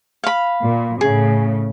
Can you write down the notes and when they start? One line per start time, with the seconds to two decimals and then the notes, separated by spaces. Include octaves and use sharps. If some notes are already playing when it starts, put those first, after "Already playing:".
0.24 F5 B5
0.62 A#2
1.01 A2 C#3 G#4